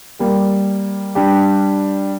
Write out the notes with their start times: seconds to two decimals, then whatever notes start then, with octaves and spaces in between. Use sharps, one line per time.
0.19 G3 A#3 G4
1.15 G3 D4 G4